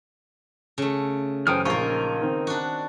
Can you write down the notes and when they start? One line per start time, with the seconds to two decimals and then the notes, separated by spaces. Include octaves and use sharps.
0.78 C#3 A3
1.47 F#2 E3 A4 C5 G5 D#6 F6
1.65 A#1 F3 A#3 D#4 F4 A#4 C#6
2.22 D#3 C4
2.47 D4 F#4